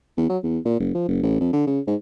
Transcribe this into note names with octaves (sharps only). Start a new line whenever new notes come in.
E2
F#3
E2
A#2
F#1
F3
F#1
A1
F2
D3
C#3
G#2